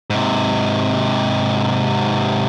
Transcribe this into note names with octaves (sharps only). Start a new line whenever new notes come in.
G#2 C3